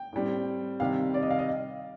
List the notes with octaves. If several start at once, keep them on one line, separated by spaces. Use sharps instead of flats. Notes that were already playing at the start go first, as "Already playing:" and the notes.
Already playing: G5
A2 G3 C4
C3 D#3 G3 F5
D5
D#5
F5
D#5